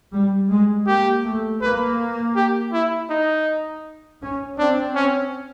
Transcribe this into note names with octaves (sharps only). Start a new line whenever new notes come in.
G3
G#3
A#3 G4
A3
A#3 B4
G4
E4
D#4
C#4
C4 D4
C#4